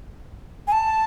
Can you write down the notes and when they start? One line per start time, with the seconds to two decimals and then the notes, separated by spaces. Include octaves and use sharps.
0.68 G#5
0.72 A5